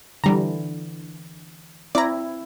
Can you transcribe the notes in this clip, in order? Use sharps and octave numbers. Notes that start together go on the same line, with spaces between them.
D3 E3 G3 A#5
C4 E4 D5 A#5